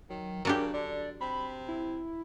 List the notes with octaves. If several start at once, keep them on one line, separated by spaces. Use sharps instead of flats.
D#3 F#3
C#3 F#3 D4 G4 A#4
D3 D5
C3 B5
E4